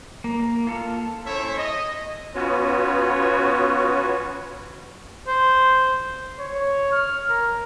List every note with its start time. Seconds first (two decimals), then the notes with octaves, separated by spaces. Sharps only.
0.24 A#3
0.67 F4 A4 F5
1.25 C#4 E4 A4 C5 C#5 E5
1.57 D#5
2.35 B3 C#4 F4 F#4 B4 C#5
5.27 C5
6.40 C#5
6.92 F6
7.29 A#4